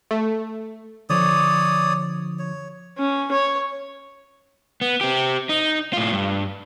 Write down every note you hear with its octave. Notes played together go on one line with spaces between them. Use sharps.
A3
D3 F3 C#5 D5 D#6
C#5
C#4
C#5
B3
C4 G4
D#4
A2 F4
G2